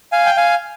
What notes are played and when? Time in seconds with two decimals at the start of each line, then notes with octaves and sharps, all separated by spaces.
0.12 F5 G#5
0.26 G5
0.37 F5 G#5